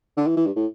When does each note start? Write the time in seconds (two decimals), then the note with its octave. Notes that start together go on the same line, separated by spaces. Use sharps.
0.17 D3
0.26 E3
0.36 E3
0.46 G2
0.56 A2